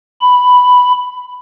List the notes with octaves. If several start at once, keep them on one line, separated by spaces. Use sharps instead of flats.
B5